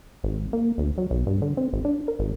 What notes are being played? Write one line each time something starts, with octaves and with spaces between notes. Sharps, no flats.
G#1
A#3
D2
F#3
B1
G2
D3
C4
G#1
D4
A#4
G#1